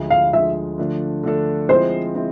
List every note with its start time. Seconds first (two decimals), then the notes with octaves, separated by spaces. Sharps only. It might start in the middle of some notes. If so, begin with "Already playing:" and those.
Already playing: D2 D3 F3 G#3
0.10 F5
0.33 D2 D3 F3 G#3 E5
0.78 D3 F3 A3 D4 A4
1.23 D3 F3 A3 D4 A4
1.69 F3 G#3 C4 E4 C5
2.15 G#3 C4 E4